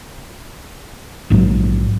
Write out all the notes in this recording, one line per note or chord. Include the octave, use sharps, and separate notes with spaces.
A#1 G#2 E3 F#3